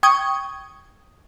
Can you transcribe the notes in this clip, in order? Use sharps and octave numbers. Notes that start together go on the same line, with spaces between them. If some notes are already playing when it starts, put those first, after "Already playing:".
G5 C#6 D#6 G#6